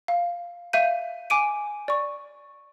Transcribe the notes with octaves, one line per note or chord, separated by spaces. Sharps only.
F5
E5 F5 G6 D#7
G#5 D6 D7 D#7
D5 C#6